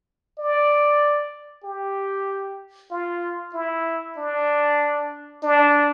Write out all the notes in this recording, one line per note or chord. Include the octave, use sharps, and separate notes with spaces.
D5
G4
F4
E4
D4
D4